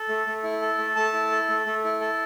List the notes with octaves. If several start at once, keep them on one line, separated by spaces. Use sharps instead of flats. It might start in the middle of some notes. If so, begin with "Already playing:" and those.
Already playing: A4
A3
A3
E4
A4
A3
A3 A5
E4
A4
A3
A3
E4
A4